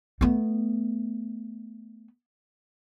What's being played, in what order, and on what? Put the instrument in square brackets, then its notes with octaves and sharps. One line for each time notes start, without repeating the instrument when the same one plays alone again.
[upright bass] A3 B3